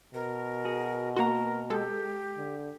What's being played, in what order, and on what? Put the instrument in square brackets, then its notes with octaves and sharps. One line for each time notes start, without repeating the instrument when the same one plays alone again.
[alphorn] B2 [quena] A#4
[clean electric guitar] F#4 G#4
[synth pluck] A#3 F#4 [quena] A#4 [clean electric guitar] A#5 C6
[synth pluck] G#3 A4 [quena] G4
[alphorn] D3